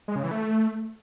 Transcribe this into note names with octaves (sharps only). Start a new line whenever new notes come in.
G#3
C#3
E3
A3